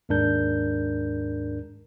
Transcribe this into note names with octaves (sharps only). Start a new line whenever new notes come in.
D#2 G#2 G#3 D4 A#4 G6